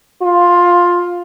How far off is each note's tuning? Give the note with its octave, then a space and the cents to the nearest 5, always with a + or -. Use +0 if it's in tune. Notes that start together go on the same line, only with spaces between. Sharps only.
F4 +10